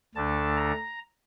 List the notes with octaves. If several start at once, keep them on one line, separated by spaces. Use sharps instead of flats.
D2 D3 A3 D4 A5
A#5